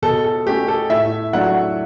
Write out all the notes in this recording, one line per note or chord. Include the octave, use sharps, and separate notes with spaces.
B2 A4
A4
A3 C#4 G4
A4
A2 E5
F#3 A3 D4 F#5